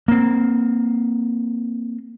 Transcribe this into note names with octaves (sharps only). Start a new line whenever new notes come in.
A#3 C4